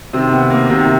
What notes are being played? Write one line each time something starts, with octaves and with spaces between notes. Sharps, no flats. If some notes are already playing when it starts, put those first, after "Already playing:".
C3 D#3 C4
B3
A#3
C3 D#3